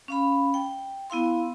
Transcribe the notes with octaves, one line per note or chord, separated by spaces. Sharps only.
C#4 F5 B5
G5
B3 E4 F5 C6